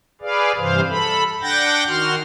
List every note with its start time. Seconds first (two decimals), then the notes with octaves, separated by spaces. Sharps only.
0.21 G#4 B4 D5 F5
0.58 G2 C3 E3 C5 F5
0.89 A4 B5
1.42 D4 F#5 G5 G6 A6 A#6
1.88 D#3 F#4 C6 F6